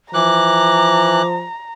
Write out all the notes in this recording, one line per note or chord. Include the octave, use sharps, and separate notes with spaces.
E3 F3 A#5 D6 F#6